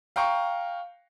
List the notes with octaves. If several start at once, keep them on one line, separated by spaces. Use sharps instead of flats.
F5 G5 A#5 C#6